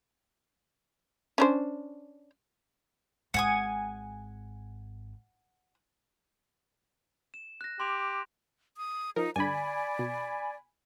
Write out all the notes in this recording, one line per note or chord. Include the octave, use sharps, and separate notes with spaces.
C#4 D4 C5
G#1 F#5 G#5 D#6
E7
F#6 A#6
G4 C6 D6 F7
D#6
F3 D#4 A#4
G2 D3 D5 G#5 B5
B2